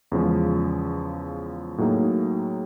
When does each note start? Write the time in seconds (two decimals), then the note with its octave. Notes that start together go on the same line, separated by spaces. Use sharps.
0.12 E2 C#3 F3 G#3
1.78 A2 F#3 A#3 D#4 G#4